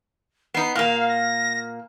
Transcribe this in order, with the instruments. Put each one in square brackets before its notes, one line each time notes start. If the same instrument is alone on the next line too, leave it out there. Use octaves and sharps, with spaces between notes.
[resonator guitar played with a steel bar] B3 D#4 [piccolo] C7
[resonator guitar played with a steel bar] A#2 A#3 [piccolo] F5
[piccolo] A#6